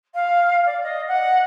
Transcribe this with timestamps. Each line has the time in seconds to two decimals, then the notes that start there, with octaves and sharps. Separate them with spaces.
0.14 F5
0.66 D5
0.83 D#5
1.08 F#5